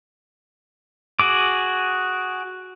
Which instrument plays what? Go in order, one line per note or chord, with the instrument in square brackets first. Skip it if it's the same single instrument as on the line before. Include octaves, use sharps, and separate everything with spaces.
[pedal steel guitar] F#4 G#4 D6